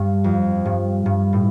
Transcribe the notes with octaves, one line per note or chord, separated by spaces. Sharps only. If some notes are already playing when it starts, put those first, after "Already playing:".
Already playing: G2
F2
G2
G2
A2